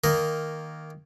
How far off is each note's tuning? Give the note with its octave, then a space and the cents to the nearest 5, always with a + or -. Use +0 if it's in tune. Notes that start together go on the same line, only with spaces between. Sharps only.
D#3 +0 A#3 +0 D#5 +0